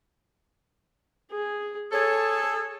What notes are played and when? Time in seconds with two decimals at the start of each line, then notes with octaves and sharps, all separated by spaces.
1.31 G#4
1.92 G#4 A4 C#5